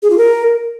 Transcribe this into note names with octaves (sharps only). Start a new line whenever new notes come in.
G#4
F4
A#4